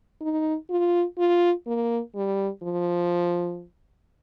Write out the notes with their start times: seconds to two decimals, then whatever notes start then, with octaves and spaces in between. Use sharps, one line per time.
0.21 D#4
0.70 F4
1.18 F4
1.67 A#3
2.15 G3
2.62 F3